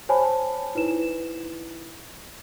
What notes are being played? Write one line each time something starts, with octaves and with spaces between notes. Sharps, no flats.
C5 C#5 G#5 A5 B5
D#4 E4 B4 E7